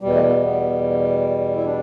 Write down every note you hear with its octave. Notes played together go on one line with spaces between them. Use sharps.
E2 B2 G3
A3
B3
B3
E4
D4